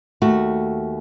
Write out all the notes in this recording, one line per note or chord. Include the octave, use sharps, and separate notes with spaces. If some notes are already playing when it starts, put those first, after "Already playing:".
D#2 A3 F#4